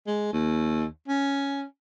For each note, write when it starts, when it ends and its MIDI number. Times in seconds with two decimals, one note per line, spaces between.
0.07 0.33 56
0.33 0.85 39
1.08 1.64 61